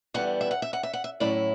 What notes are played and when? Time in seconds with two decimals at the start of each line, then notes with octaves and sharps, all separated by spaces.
0.14 E2 D3 G3 B3 F#5
0.41 E5
0.51 F#5
0.62 E5
0.73 F#5
0.83 E5
0.93 F#5
1.04 E5
1.20 A2 F#3 C#4 E4 D5